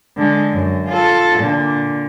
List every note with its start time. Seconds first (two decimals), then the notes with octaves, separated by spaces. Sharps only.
0.17 D3 G#3
0.53 F#2
0.88 F4 A4
1.39 A#2 D3